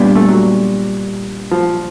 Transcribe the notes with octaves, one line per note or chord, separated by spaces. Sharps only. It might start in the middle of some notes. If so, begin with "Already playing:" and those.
Already playing: A#2 G3 B3 D4 F4
A3
F#3
F3